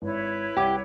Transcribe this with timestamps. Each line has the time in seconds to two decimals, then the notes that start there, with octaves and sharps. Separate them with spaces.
0.02 G#1 E4 B4 C#5
0.57 C2 G4 F#5 D6